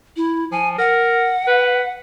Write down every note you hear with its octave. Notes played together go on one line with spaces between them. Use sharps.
E4
F3 G#5
A#4 F#5
B4